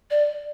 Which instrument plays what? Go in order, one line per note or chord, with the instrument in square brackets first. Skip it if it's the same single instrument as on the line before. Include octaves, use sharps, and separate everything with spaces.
[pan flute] D5